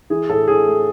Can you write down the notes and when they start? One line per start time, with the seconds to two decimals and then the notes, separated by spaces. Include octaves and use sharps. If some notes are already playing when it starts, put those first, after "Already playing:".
0.10 E3 G#4
0.29 A2 A4
0.48 A2 G#4
0.67 A3